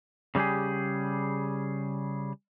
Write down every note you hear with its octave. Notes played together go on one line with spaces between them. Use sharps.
C#3 G3 A#3 G4 G#4